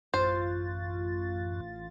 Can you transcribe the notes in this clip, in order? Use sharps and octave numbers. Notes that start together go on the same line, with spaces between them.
A1 F#2 F4 C5 A6